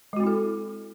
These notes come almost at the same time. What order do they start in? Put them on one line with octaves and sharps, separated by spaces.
G#3 F#4 C4 E4 A4